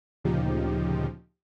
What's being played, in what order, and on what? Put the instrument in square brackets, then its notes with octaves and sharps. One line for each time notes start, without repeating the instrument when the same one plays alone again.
[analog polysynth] D2 A#2 C#3 F3 D#4 G4